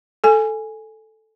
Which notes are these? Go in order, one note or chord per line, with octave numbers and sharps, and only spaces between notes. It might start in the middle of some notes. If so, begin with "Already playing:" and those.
A4 G#5